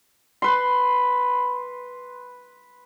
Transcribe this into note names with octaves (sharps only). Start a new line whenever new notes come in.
B4 C6